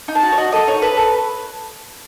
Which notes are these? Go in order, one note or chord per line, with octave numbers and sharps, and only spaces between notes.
D#4
A5
F#4
C#5
F#4 D#5
A4 D#5
D#4 C#5
A4 B4
A4